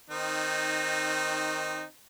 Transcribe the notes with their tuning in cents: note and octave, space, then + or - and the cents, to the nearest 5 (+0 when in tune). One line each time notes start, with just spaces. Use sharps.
D#3 +0 C4 +0 D#4 -15